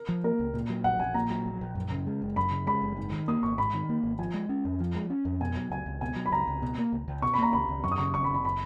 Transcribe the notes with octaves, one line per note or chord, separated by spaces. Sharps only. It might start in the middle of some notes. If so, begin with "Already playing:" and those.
Already playing: A#4
F3
A#3 A#4
C#2
A#2
F#3
A#1 F#5
A#1 G#5
A#2 A#5
F#3
A#1
A#1
F#2
C#3
G#3
F#1
F#2 B5
C#3
G#3 B5
F#1
G#2
D#3
A#3 D#6
G#1 C#6
G#2 B5
D#3
A#3
G#1
F3 G#5
G#3
C#4
F2
F3
G#3
C#4
F2
B2 G#5
F#3
C#2 G#5
C#2
B2 G#5
F#3
B5
C#2 A#5
C#2
B2
A#3
C#2
C#2
B2 C#6
B5
A#3 A#5
C#2 B5
C#2
F#2 C#6
D#6
C#3 C#6
F#1 C#6
B5
F#1
B5
B5